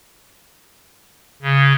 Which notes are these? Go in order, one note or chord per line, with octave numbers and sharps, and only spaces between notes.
C#3